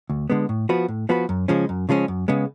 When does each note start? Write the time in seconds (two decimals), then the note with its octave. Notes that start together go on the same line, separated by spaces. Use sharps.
0.10 D2
0.30 D3 G#3 B3
0.49 A2
0.69 F3 B3 F#4 B4
0.88 A2
1.09 F3 B3 F#4 B4
1.29 F#2
1.48 C#3 F3 G#3 C#4
1.69 F#2
1.89 C#3 F3 G#3 C#4
2.08 F#2
2.28 C#3 G#3 B3